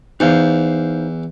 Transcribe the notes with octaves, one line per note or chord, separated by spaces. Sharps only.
E2 D#4 C5 F5